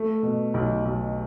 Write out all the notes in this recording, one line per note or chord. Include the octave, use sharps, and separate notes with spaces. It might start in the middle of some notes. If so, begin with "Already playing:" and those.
Already playing: A3
B2
B1
B1